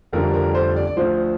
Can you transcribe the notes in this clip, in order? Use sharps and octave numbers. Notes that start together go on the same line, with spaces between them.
F1 F2 D3 G3 A#4
A#4
C5
D5
D5
D2 D3 F3 C5